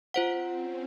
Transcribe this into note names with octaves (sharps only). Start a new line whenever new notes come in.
C4 F4 C5 F#5
C#4